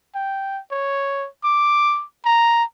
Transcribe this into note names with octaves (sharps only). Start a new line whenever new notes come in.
G5
C#5
D6
A#5